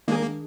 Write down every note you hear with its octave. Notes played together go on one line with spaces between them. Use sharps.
D#3 G#3 A#3 D4 G#4